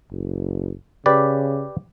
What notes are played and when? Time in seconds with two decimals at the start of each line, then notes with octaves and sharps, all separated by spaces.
0.11 F#1
1.06 C#3 G4 B4 D5